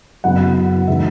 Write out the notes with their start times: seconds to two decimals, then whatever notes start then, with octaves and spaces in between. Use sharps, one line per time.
0.24 F#2 C#3 F#3 B3 E4 F#5
0.87 C#3 E3 G#3 D#4 E5